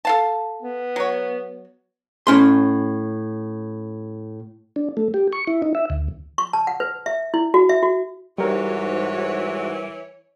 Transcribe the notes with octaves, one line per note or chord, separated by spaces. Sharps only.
A4 F5 A5
B3
F#3 C#5
A2 C#4 C6
D4
A3
G4
C#6
E4
D#4
E5
D2
C#6
A5
F#5
B4
E5
E4
F#4
E5
F#4
G#2 E3 G3 F#4 A#4 C#5